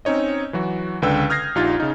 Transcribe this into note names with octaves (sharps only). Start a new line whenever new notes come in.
C4 C#4 D#4 C#5 D#5
E3 F#3 F#4
C#2 D3 B4 G5 E6
D#6 F6 G6 G#6 A#6 C7
A#1 D#4 F4 G4 A6
C#3 D#4